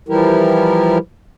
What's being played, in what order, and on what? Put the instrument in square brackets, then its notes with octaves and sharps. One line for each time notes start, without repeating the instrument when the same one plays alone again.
[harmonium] E3 F3 G3 E4 G4 A#4